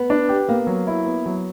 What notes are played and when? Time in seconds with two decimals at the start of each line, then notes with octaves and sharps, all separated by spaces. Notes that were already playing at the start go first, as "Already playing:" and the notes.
Already playing: B3
0.10 D4
0.29 G4
0.48 A#3 B3
0.67 F#3
0.87 E4
1.06 B3
1.26 F#3